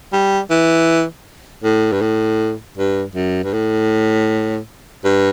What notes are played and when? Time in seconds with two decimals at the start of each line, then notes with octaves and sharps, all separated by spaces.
0.13 G3
0.51 E3
1.64 A2
1.93 G2
2.02 A2
2.78 G2
3.15 F#2
3.44 G2
3.53 A2
5.04 G2